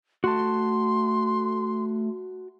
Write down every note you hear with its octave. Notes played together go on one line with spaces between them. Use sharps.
A3 F#4 A5 C6